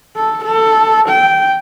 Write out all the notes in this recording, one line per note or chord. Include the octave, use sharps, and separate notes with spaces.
A4
A4
G5